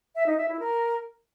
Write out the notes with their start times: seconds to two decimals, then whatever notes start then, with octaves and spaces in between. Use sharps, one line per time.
0.15 E5
0.26 D#4
0.37 E5
0.48 E4
0.60 A#4